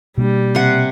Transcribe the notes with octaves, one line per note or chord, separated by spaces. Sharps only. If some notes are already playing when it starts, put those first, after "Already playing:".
B2 G3 A#3 D4
C3 F#5